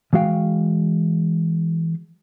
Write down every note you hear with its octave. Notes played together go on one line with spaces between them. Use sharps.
E3 G#3 F#4 F5 G5